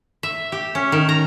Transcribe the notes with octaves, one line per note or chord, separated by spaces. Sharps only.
E5
G4
C#4
D#3
A#5